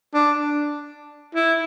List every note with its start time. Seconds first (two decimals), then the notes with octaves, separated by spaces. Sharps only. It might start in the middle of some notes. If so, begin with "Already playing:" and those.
0.14 D4
1.35 E4